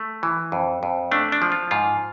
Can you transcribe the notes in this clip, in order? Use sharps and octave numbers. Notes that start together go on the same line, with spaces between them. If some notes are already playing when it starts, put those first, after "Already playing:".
Already playing: A3
E3
F2
F2
A3 D4
D4
F3
F4
G#2 F4